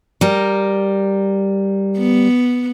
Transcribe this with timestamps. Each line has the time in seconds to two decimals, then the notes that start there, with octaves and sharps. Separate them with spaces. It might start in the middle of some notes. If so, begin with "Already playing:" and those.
0.21 G3 A#4
1.98 B3